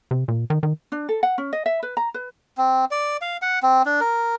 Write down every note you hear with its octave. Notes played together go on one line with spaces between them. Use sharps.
C3
A#2
D#3
D#3
D4
A4
F#5
C#4
D#5
E5
B4
A#5
B4
C4
D5
F5
F#5
C4
D4
A#4